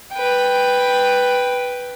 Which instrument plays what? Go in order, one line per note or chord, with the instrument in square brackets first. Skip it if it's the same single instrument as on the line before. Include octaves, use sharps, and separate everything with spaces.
[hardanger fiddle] B4 G5